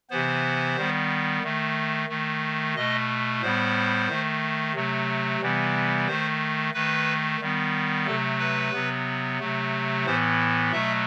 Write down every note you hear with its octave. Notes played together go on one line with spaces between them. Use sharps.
C3 E3 B3 C5
D#3 G3 B3
D#3 A3
D#3 A3
B2 A3 D#5
A2 G3 B3 C5
D#3 A3
C3 F#3 A3
C3 E3 G3 B3
D#3 A3 C5
D#3 A3 B4
D#3 G3 B3
C3 F#3 A3 A4
B4
C3 F#3 B3
C3 F#3 A3
A2 E3 B3 C5
B2 F#3 A3 E5